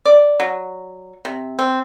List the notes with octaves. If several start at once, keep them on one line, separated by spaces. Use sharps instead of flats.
D5
F#3
C3
C4